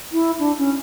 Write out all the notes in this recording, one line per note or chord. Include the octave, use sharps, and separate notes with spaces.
E4
D4
C#4